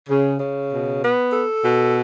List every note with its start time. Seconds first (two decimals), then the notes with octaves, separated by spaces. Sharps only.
0.09 C#3
0.40 C#3
0.71 B2
1.02 B3
1.33 A4
1.63 B2